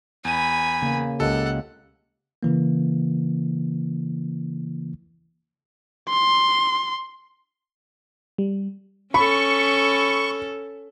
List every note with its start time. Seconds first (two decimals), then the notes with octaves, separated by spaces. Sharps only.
0.25 E2 G#5 B5 D#7
0.82 C#3 A#3
1.20 C#2 G4 A4 D#5 F#5
2.43 C#3 E3 A#3
6.09 C6
8.38 G3
9.14 C#4 A4 B5 C#6